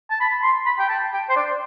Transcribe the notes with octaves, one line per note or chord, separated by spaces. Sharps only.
A5
B5
C6
B5
G5
A5
G5
C5
D5